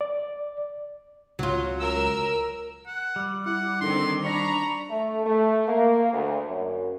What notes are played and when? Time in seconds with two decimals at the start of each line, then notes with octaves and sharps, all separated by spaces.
0.01 D5
1.39 C#2 F#3 F4
1.80 A#4 E6
2.87 F#5
3.16 G3
3.46 E4 F#5
3.81 D3 D#3 C4 A4 C6
4.24 D4 A#5 B5 C#6 A#6
4.90 A3
5.25 A3
5.68 A#3
6.13 D2
6.48 F#2